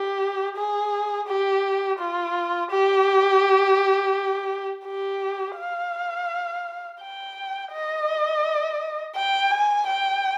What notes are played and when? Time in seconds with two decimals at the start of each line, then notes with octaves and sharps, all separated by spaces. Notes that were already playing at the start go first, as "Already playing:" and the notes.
Already playing: G4
0.57 G#4
1.28 G4
2.00 F4
2.71 G4
4.86 G4
5.57 F5
7.01 G5
7.72 D#5
9.16 G5
9.51 G#5
9.87 G5